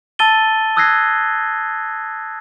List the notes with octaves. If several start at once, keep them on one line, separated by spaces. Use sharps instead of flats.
A5 E6 A6 D#7 G7
D#6 E6 F#6 G#6 A#6 C7